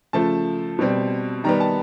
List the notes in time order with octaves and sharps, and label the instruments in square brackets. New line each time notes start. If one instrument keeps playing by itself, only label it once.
[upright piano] C#3 F3 A3 A5
B2 G3 C4
D#3 G3 B3 A#5
A5